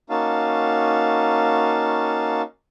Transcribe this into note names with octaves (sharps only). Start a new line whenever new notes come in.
A#3 C#4 D#4 F#4 F5 A5